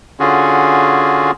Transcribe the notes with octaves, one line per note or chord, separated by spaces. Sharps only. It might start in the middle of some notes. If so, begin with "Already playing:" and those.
D3 C#4 F4 F#4 G#4